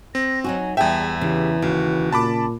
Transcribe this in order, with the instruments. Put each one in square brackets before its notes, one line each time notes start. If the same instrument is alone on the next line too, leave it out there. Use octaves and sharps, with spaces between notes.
[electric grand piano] C4 [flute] A#6
[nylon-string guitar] F#3 D#4 F#4 [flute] G#5
[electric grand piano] E2 E5 [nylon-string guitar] G3 G#4 G5 [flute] A5
[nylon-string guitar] C#3 [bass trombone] E3 [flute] G4
[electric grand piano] D#2 [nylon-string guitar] C#3 [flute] F#4
[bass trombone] A#2 [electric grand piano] A5 B5 D6